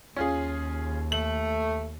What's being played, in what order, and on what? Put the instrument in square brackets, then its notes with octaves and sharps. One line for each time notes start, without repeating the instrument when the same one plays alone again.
[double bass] D#2 [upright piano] C#4 F4 G#4
[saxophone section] A3 [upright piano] F#7